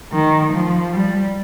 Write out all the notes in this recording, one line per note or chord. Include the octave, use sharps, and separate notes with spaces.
D#3
F3
G3